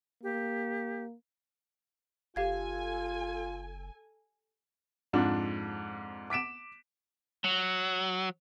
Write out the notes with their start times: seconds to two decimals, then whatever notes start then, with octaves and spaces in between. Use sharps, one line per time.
0.23 A#3 G4
2.36 F#1 F4 G4 A4 F5 G#5 G#6
5.13 F2 G#2 D4 F4
6.30 D6 B6 D7 E7
7.44 F#3